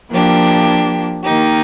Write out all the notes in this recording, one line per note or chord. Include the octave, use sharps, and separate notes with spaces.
F3 A#3 D4 G4
D#3 A#3 D#4 G4